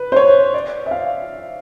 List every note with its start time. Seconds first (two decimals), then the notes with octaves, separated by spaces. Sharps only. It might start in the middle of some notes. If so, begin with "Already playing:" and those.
Already playing: B4
0.12 C5
0.16 C#5
0.54 D5
0.86 E5
0.91 F5